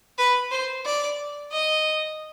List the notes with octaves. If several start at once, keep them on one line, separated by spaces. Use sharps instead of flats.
B4
C5
D5
D#5